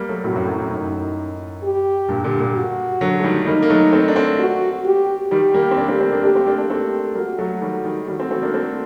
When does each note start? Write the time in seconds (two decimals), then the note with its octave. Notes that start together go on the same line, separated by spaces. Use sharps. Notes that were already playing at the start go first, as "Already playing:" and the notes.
Already playing: G3 A#3
0.09 F#3 A3
0.24 A2 C3 F#4
0.36 F#2 A2
0.48 F#2
0.59 F#2 A2
0.71 F#2 A2 D#4
1.63 G4
2.08 G2 A#2
2.24 A#2 D3
2.39 A#2 D3
2.54 F#4
3.01 D3 F#3
3.19 A3
3.24 D#3 G3
3.46 G3 A#3 D#4
3.63 A#3
3.70 F#3 A3
3.93 A3 C4
4.08 D4
4.16 A3 C4
4.39 F#4
4.85 G4
5.31 D#3 G3 G4
5.54 G3 A#3
5.71 C4
5.77 A#3 D4
5.89 A3 C4
6.01 A3 C4
6.12 A#3 D4
6.23 A#3 D4 G4
6.35 A3 C4
6.46 A#3 D4
6.58 A#3 D4
6.70 A3 C4 G4
7.15 G3 A#3 F#4
7.38 F#3 A3
7.61 D#3 G3
7.85 D#3 G3
8.08 D#3 G3 F#4
8.20 A3 C4
8.31 A3 C4
8.42 A#3 D4
8.54 A3 C4